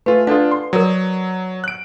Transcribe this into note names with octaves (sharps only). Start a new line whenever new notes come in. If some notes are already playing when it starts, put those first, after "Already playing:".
A3 F4 B4 G#5
D4 F4 A4 D5 F#5
C6
F#3 A#4 D5 D#6
F#6 D7